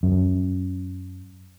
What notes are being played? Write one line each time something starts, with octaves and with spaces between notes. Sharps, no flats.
F#2